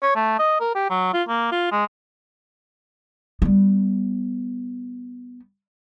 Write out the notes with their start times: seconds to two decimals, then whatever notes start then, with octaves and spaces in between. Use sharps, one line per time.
0.02 C#5
0.16 A3
0.39 D#5
0.60 A#4
0.75 G4
0.90 F#3
1.14 F4
1.28 A#3
1.52 F4
1.72 G#3
3.42 G3 B3